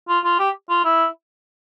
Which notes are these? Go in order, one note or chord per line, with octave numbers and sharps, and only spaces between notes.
F4
F4
G4
F4
E4